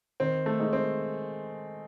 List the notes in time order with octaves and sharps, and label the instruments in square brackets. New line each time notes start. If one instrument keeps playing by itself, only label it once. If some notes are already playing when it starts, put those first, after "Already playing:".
[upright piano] D#3 [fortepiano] C4
[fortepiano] A3
[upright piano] G#3 D#4
[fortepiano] C4